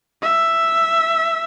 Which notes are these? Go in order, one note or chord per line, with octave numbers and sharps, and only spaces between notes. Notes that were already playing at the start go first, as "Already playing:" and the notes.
E5